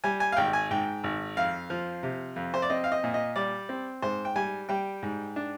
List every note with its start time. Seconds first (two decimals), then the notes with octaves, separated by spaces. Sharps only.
0.04 G3 G#5
0.20 G#5
0.32 F5
0.37 G#1 G5
0.53 G#5
0.71 G#2 G5
1.04 G#1
1.37 F2 F5
1.70 F3
2.03 C3
2.36 F2
2.54 C5
2.62 D5
2.70 C4 D#5
2.84 F5
2.92 D#5
3.04 A#2
3.14 D#5
3.36 G3 D5
3.69 C4
4.02 G#2 C5
4.25 G5
4.36 G3 G#5
4.69 G3 G5
5.03 G#2
5.36 D4